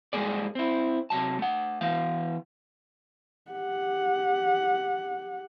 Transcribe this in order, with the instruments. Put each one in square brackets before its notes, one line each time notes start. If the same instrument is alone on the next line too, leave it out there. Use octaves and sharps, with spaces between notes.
[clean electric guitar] G#2 G3 G#3 A#3 G#4 D5
C4 E4
C3 F3 F#3 A5
A3 F#5
E3 B3 F5
[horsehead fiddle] G4 F#5